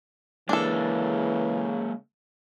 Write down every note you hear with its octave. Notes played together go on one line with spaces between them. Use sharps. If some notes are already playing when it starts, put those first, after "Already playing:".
C#3 E3 G#3 A#3 D4 A4